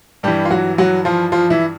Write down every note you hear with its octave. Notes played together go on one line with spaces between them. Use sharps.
G2 E3 G3 G4
F4
F#3 F#4
F#3 F#4
F3 F4
F3 F4
E3 E4